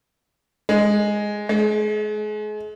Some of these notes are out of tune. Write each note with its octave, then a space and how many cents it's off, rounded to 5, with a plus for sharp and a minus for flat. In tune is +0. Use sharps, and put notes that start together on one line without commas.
G#3 +0
G#3 +35